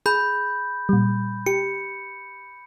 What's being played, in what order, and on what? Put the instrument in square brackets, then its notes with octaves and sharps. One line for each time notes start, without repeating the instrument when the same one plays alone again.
[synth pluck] G#4 [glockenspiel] B5 G6
[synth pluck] A#2 G3
[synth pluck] G4 [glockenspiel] C#7